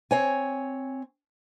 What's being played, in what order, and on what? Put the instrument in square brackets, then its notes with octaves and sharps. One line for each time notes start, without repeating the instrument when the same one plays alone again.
[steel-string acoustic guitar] C4 C#5 G#5